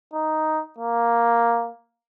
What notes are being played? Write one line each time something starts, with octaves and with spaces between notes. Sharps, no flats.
D#4
A#3